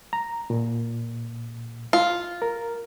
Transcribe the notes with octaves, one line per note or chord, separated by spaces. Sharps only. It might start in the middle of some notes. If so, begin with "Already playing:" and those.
A#5
A#2
F4
A#4